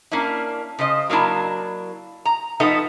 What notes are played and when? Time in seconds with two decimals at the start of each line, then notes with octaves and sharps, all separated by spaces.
0.11 A#3 C#4 D4 E4
0.79 C#3 C5 D#5
1.10 F#3 A#3 D4 E4 A5
2.25 A#5
2.60 F3 B3 D#4 A4 E5